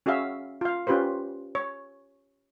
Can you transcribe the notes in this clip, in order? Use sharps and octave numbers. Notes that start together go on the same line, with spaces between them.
C#4 F#4 G#4 E5 F5
F4 F5
C#4 F4 G4 B4 C5
C#5